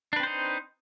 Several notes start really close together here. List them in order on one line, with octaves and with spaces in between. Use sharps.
D4 B4 C4 C5 D#4